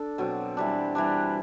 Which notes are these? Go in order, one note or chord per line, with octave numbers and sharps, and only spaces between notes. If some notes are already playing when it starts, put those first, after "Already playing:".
Already playing: D4 A4
B2 F#3 C4
E3 G3 D4
E3 G3 D4